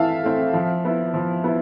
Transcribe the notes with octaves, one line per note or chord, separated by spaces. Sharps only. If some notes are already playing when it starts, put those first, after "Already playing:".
Already playing: E3 A3 C4 E4 E5 F5 A5
A3 C4 E4
F3
B3 E4
F3
B3 E4